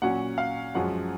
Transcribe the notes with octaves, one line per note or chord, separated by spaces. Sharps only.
A#2 F#3 C#4 F#5
F5
F#2 F3 G#3 C#4 F#5